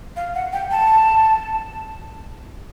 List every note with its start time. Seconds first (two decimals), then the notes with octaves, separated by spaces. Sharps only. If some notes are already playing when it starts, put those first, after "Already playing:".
0.16 F5
0.35 F#5
0.53 G5
0.71 A5